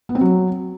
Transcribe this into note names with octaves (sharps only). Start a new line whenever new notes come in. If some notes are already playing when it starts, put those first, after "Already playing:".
B3
C4
F#3